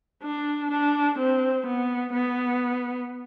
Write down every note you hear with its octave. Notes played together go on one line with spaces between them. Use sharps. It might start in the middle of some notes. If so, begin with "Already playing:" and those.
D4
D4
C4
B3
B3